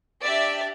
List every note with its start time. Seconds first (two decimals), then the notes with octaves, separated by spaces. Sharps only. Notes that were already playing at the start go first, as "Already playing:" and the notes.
0.24 D4 G4 D5 E5